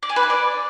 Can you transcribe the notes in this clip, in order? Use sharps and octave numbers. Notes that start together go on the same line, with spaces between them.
D5
G#5
B4
G#5
D5